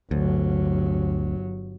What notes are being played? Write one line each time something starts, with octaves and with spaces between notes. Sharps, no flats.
G1 D2 F#3